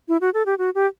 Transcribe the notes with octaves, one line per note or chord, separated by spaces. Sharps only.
E4
F#4
A4
G4
F#4
G4